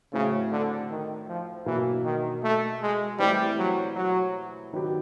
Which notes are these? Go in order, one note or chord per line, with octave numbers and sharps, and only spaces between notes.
A2 C#3 F#3 A3 C4
D3
D#3
F3
B2 E3 F#3 A#3 D4
D#3
A3
G#3
E3 G3 A3 C4 E4 G4
F#3
F#3
D#3 F#3 B3 D4 G4